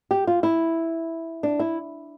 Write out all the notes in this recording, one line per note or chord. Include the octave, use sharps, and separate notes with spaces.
G4
F4
E4
D4
E4